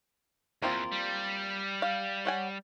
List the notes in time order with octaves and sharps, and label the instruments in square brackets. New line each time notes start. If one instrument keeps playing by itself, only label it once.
[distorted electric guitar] E2 [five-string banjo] A#3 C4 F4
[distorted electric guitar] G3
[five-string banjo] F5
C#5 F#5 G#5